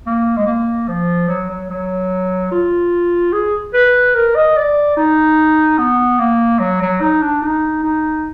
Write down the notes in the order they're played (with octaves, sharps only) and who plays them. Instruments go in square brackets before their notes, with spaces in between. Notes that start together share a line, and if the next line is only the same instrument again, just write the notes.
[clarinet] A#3
G#3
A#3
F3
F#3
F#3
F#3
F4
G#4
B4
A#4
D#5
D5
D#4
B3
A#3
F#3
F#3
D#4
D4
D#4
D#4